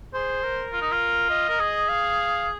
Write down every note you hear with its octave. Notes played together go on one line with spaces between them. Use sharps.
G#4 C5
A#4
F4
D#4
F4
D#5
A#4
G#4
F5